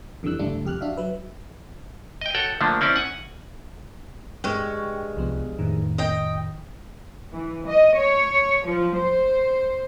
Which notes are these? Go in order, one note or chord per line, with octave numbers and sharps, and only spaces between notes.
F2 D3 E3 G3 E6 F#6
G1 C#2 D3 G3 A3 D4
C2 F2 G4 F6 F#6
D4 F#4 E5 F5
F#3 B4 E5
D#5 G5
F#4 A4 C#5 F#5 G5
D3 F3 A3 A#3 D4
C4 C#4 E4 D5
F#5 G#5
G2 G#3 G5 C#6
C2 F3 B3
F2 A2 D#3
D#5 G5
E3
D#5
C#5
F3
C5